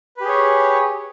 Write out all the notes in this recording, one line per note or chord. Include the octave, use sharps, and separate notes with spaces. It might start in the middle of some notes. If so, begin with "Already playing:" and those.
G4 G#4 B4 C#5